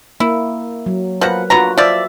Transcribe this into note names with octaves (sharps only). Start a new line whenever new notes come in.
A#3 E4
F#3
F3 F#4 A#4 B4 F#5
D3 B3 F4 F#4 B4 A#5
F3 D5 E5